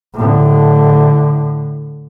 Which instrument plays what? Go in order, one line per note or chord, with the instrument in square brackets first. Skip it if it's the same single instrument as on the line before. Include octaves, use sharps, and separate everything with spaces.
[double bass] A2 D3